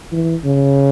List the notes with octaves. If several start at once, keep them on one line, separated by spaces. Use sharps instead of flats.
E3
C#3